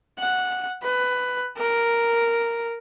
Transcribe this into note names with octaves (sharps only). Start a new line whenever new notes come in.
F#5
B4
A#4